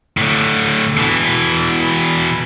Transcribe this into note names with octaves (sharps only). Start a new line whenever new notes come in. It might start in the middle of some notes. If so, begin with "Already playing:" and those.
A2 D3
B2 E3